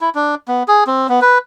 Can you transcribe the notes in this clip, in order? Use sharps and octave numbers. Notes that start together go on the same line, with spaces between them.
E4
D4
B3
G#4
C4
B3
B4